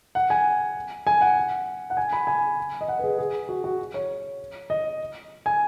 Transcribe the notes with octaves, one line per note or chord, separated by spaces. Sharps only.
F#5
G#5
G#5
F#5
F#5
G#5
B5
G#5
D#5
F#5
B4
G#4
G#4
F#4
F#4
C#5
D#5
G#5